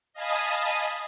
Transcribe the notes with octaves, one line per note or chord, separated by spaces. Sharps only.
D#5 F5 G#5 A5 B5 D#6